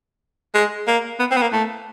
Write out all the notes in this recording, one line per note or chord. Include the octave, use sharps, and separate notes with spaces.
G#3
A#3
B3
C4
B3
A#3
A3